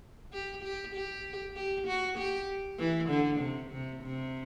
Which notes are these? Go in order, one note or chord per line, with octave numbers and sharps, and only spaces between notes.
G4
G4
G4
G4
F#4
G4
E3
D3
C3
C3
C3